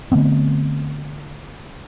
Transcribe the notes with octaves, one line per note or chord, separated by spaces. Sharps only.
D3 A3 B3 C4